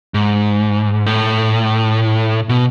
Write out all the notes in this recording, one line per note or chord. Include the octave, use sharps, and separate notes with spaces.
G#2
A2
B2